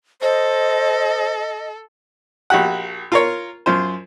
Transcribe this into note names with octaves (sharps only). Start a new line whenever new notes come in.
A4 C5 D#5
A#1 F#4 G4 F#5
F4 A#4 C#5
F#2 F4 C5